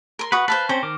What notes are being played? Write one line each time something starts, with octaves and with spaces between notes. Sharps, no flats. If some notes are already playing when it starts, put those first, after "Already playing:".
A#4 C6
F#4 B4 C#6 D#6
B4 C5 F5 A5
C4 C#4 C5
D#3 A#4 D6